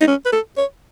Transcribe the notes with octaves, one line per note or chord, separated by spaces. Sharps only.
D#4
C#4
B4
A4
C#5